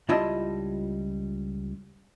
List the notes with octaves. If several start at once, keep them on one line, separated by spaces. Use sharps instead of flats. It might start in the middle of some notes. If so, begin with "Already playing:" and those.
C#2 G3 E4 F4 D#5 A5